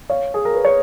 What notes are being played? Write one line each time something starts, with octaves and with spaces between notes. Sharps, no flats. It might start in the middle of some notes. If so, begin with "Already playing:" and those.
C#5 F5
G#4
A#4
B4
C#5